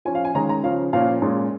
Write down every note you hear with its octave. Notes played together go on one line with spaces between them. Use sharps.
F3 C#4 G#5
F5
G#5
D#3 G#3 C#4 A#5
A#5
C#3 F3 C#4 F5
A#2 F3 A#3 C#4 F5
A#2 G#3 C#4